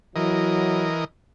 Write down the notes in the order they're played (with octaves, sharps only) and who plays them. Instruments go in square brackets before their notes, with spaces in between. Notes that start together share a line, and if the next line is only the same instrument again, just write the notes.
[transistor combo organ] E3 A#4 D#5 [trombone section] F#3 E4